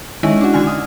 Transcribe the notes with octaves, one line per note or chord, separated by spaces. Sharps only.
D#3 G#3 C#4 E4
D4 F#4
D3 D#3 G#5 F6
D#6